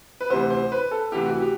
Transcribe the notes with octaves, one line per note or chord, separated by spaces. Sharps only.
B4
D2 C3 E3 C5
C5
B4
A4
D2 C3 E3 G4
F#4
G4